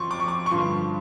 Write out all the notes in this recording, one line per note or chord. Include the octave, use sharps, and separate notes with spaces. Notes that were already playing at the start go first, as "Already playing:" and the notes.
Already playing: F2 C6 C#6
D6
C#6
D6
C#6
G2 D3 F3 C6